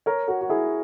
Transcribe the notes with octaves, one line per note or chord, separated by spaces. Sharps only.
A#4 C#5
F#4 A#4
F#4
E4 G#4